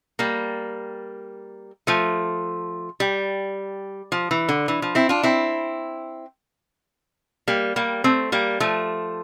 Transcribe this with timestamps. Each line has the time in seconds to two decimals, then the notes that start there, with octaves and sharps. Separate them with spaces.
0.19 G3 A#3
1.87 F3 A3
3.00 G3
4.12 F3
4.31 E3
4.49 D3
4.68 E3
4.82 F3
4.95 C4 E4
5.09 D4 F4
5.23 C4 E4
7.48 G3 A#3
7.76 G3 A#3
8.04 A3 C4
8.32 G3 A#3
8.60 F3 A3